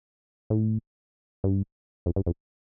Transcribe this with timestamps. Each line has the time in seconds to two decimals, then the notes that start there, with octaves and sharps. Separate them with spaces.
0.50 A2
1.44 G2
2.06 F2
2.16 G2
2.26 F2